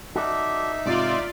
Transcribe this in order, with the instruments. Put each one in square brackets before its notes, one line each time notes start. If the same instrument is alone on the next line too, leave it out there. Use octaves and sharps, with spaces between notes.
[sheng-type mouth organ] D#4 E5 [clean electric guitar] F#4 A4 D5
[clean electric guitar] G#2 C3 [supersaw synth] F4 D5